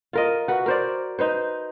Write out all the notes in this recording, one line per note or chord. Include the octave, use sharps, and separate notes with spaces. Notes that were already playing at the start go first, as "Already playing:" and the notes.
F4 A#4 D#5
F#4 B4
A#4 C5 D5
D#4 B4 C5